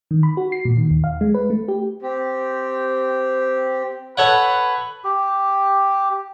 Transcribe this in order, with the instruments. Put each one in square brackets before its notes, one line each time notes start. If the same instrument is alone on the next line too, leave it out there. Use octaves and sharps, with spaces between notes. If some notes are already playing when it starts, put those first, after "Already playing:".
[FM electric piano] D#3
B5
F#4
C7
A#2
D#3
D#2
F5
G#3
B4
A3
G4
[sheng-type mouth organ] C4 G4
[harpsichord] A4 C#5 F#5 [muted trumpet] B4
[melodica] G4